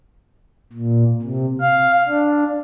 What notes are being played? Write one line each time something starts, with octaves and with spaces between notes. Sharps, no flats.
A#2
C3
F5
D4